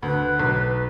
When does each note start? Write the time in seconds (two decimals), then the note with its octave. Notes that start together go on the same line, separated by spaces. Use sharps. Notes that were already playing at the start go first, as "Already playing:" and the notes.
0.03 D2 B4
0.39 B1